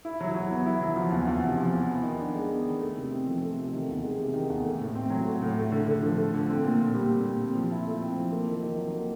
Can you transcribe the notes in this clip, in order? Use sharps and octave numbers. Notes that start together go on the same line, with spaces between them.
E4
F#3
F#3
B3
E4
F#3
F3
E2
E2
C3
F3
E2
B3
D#3
D4
G#3
B3
D#3
A3
C3
C4
F3
A3
C3
D#3
E2
G#3
C3
D#3
E2
A3
A2
C4
F#3
A3
A2
A3
D3
D3
F3
A3
D3
C4
A#2
A#2
G3
C4
A#2
C4
F3
E4
A3
C4
F3
A#3
D#3
D#3
F#3
A#3